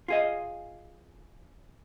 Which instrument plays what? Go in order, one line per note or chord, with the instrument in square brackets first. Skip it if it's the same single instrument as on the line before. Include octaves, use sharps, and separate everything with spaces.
[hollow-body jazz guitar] F4 G#4 D#5